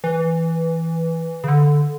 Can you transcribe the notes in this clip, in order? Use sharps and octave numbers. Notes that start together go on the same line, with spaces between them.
E3
C#3
D3